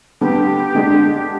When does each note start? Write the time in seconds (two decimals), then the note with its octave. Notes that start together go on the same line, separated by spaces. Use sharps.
0.21 D3 G3 B3 G4
0.75 D3 G#3 D4